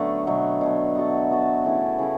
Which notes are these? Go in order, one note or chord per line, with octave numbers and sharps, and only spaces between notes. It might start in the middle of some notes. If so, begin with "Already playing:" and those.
Already playing: D3 F#3 A3 B3 D4 F#4 A4
B2 F#3 A3
B2 F#3 A3
B3 F#4 A4
B3 F#4 A4
C#3 E3 A3 E4
C#3 E3 A3 E4